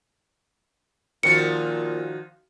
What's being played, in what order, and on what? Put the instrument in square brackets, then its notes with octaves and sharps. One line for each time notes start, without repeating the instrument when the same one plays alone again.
[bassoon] A#2 [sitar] D#3 F3 F#4 [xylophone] C#7